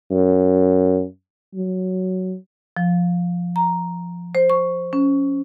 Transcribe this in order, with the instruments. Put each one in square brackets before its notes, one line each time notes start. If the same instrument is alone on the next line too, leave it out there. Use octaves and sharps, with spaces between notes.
[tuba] F#2
F#3
[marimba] F3
A#5
C5
C#6
C#4